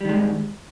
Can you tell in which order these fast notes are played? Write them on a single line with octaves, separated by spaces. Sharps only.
G3 D#3 G#3 G#2